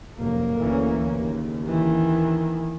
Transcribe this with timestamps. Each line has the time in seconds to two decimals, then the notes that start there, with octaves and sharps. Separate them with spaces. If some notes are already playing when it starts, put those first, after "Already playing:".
0.18 F1 F#2 A#3
0.60 D2 E3 C#4
1.13 D#2 C#3
1.65 D#3 E3